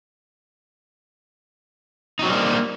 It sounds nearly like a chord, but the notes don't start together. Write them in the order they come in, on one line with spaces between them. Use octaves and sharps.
D#4 F#3 C4 G3 A#3